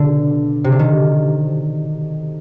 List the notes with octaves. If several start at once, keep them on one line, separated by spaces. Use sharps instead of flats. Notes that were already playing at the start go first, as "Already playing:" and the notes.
Already playing: B2 D3
C3
D3
D#3